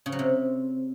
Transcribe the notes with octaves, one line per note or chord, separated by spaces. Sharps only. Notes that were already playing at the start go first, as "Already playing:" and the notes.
C#3
F#3
C3